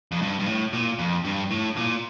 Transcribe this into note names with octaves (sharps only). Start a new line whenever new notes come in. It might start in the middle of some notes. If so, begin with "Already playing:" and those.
F2
G2
G2
A2
A#2
F2
G2
A2
A#2